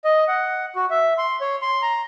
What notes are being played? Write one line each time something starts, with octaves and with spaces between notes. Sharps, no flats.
D#5
F#5
F#4
E5
C6
C#5
C6
A#5